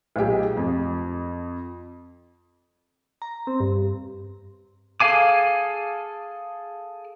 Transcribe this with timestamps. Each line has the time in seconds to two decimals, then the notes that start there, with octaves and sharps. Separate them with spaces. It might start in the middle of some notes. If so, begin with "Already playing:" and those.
0.16 B1 A#2 G4 G#4
0.57 F2
3.22 A#5
3.47 C4
3.60 G2
5.00 G#4 A4 F5 G#5 D6